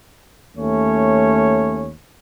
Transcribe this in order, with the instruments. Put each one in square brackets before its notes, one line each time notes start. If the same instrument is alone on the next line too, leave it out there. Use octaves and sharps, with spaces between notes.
[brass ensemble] D#2 A3 C#4 C#5